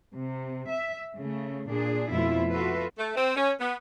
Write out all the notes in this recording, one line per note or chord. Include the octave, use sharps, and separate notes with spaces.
C3
E5
C#3 A3
A#2 D4 G#4
F2 B2 A3 E4 F4 E5
F4 F#4 A4 B4 E5
A3
C4
C#4
B3